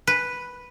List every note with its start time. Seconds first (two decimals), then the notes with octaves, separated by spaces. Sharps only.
0.07 B4